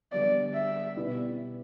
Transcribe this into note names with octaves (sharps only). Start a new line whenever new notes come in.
D3 G3 B3 D5
E5
B2 B3 E4 G4 D5